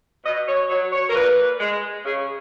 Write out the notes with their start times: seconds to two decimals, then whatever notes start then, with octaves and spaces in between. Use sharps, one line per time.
0.24 B2 D#5
0.48 C#5
0.69 F#3 C#5
0.93 C#5
1.10 A#4
1.14 A#2 B4
1.60 G#3
2.05 C#3 G#4